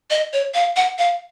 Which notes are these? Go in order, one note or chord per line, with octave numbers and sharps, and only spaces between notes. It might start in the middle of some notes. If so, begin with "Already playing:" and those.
D#5
C#5
F5
F#5
F5